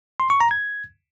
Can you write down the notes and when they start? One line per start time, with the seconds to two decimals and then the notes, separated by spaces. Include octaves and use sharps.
0.20 C6
0.30 C#6
0.40 A#5
0.51 G#6